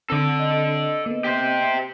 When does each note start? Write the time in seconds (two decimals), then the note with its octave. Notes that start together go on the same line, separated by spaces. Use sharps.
0.10 D3 C4 A4 D5
0.39 D#5
1.06 A#3 B3
1.24 G4 C5